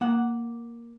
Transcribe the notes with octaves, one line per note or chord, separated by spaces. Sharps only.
A#3 F#5